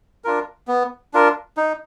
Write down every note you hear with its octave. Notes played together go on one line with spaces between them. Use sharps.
D4 F4 A#4
B3
D4 F4 A#4
D#4